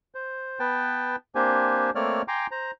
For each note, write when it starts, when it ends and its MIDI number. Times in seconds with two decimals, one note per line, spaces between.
0.15 0.59 72
0.60 1.16 59
0.60 1.16 71
0.60 1.16 79
0.60 1.16 81
1.35 1.90 58
1.35 1.90 60
1.35 1.90 62
1.35 1.90 67
1.35 1.90 72
1.35 1.90 80
1.95 2.22 57
1.95 2.22 58
1.95 2.22 60
1.95 2.22 73
1.95 2.22 74
1.95 2.22 89
2.28 2.47 79
2.28 2.47 80
2.28 2.47 82
2.28 2.47 84
2.28 2.47 86
2.51 2.71 72
2.51 2.71 82